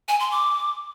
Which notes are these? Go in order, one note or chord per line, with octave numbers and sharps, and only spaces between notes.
G#5
C6
D6